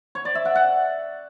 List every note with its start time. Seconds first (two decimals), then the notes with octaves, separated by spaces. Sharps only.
0.15 C#5
0.25 D5
0.35 E5
0.45 F#5
0.55 F#5